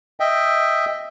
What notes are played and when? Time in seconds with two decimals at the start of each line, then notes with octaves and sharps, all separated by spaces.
0.20 D#5 E5 G5